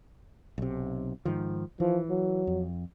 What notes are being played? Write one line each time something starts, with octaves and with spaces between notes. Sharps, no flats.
B1 C3
G#2 D#3 F3
E3 F3
F#3
F2